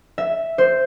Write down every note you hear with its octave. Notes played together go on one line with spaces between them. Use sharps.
E5
C5